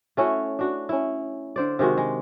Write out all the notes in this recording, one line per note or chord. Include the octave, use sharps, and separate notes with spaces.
A3 C#4 E4 F#4
D4 F#4
C#4 E4
D3 C5 D5
C3 D#3 G#3 F#4
G#3